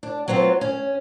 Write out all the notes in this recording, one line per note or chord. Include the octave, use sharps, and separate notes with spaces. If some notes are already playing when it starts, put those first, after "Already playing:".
D4
F#3 B3 C4 F4
C#4